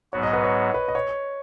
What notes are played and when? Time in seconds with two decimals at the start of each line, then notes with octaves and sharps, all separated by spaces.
0.13 G#2 F#3 B3 F#4 C#5
0.23 D#5
0.33 B4
0.44 C#5
0.74 B4
0.88 D#5
0.95 C#5